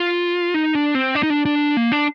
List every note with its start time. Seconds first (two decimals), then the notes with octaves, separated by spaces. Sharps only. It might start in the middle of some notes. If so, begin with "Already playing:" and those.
Already playing: F4
0.54 D#4
0.75 D4
0.95 C4
1.15 D4
1.23 D#4
1.30 D4
1.45 D4
1.77 A#3
1.92 D4